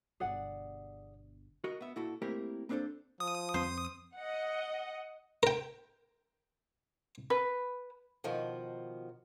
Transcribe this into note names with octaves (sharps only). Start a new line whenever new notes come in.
G1 B2 G#4 D5 F#5
F#4 A#4 D#5
B3 E5
A#2 E4 F#4 A4
A3 A#3 C4 E4 G4 A#4
A#3 C4 D4 G4 A4 C5
F3 D#6
F2 C4 C5
D#5 F#5
A#4 G5
B4
B2 D#3 F3 F#4